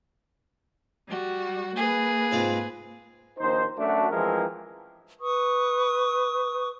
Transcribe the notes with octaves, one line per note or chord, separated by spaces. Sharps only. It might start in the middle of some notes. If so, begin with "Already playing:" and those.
G3 F#4
A#3 G#4 B4
G#2 C4 F4
A#1 D#2 D#4 C5
F#2 A3 D4 F#4
E3 F3 G#3 C4 E4 A#4
B4 C#6 D#6